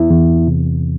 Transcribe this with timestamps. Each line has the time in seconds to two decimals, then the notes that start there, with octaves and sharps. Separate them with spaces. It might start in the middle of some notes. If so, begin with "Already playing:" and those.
Already playing: E2 B3 E4
0.11 E2
0.47 C3